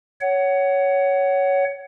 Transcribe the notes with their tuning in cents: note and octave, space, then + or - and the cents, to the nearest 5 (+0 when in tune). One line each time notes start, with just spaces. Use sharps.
C#5 +10 F#5 +20